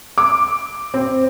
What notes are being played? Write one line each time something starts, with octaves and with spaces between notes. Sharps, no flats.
D6
C4